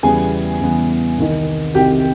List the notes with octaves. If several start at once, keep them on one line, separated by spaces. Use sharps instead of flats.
E2 C#3 E3 G3 B3 G#4 G#5
E2 C#3 E3 G3 B3
C2 C3 D#3
C2 C3 D#3 G4 G5